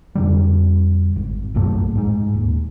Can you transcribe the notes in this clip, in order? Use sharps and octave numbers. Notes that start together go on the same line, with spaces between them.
F2 D3 G3
G#1
B1 F#2 A2 A3
G#2 G#3
D#1